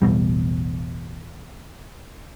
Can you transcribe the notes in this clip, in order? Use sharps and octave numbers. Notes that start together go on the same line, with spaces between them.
E1 A1 B2 G3